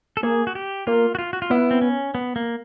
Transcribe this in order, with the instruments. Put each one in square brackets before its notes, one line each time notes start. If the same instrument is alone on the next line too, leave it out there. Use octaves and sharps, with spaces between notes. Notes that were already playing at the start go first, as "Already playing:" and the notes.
[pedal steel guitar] A4
[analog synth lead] A#3 [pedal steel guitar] G#4
[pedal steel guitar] F#4
G4
[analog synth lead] A#3 [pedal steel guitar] F4
[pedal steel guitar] F#4
F4
F#4
F4
[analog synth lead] B3 [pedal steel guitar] E4
[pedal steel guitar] C4
C#4
B3
A#3